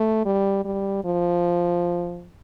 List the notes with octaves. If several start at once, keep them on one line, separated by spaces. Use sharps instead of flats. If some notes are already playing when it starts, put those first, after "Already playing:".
Already playing: A3
G3
G3
F3